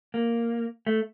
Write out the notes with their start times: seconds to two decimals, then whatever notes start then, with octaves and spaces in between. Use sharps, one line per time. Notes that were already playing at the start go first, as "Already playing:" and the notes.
0.14 A#3
0.87 A3